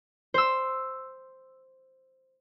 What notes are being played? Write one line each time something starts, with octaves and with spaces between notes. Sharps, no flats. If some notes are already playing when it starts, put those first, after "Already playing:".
C5 E6